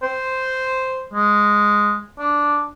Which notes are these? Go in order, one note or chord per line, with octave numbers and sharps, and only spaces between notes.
C5
G#3
D4